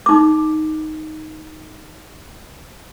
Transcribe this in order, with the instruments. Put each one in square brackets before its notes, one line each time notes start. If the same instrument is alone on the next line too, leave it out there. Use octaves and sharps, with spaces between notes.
[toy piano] D#4 D6